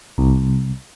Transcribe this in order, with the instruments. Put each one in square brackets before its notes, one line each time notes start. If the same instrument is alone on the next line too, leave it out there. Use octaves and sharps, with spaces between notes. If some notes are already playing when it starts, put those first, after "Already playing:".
[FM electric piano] C2